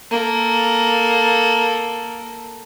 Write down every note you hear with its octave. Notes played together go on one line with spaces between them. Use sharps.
A#3 A4